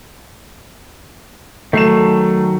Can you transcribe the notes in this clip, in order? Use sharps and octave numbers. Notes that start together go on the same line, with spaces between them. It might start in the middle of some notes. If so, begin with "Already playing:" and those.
D#3 F#3 A3 C7 E7